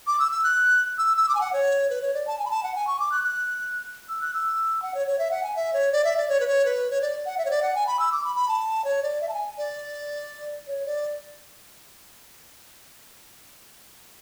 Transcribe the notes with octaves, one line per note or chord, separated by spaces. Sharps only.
D6
E6
E6
F#6
E6
E6
D6
G#5
F#5
C#5
B4
C#5
D5
A5
G#5
B5
A5
F#5
G#5
C#6
D6
F#6
F#6
E6
F#6
E6
F#5
C#5
C#5
E5
F#5
G#5
E5
C#5
D5
E5
D5
C#5
B4
C#5
B4
C#5
D5
F#5
E5
C#5
D5
F#5
G#5
B5
E6
D6
B5
B5
A5
C#5
D5
E5
A5
G#5
D5
C#5
D5